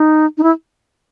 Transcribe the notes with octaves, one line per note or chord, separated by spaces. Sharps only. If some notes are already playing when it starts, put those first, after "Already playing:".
Already playing: D#4
D#4
E4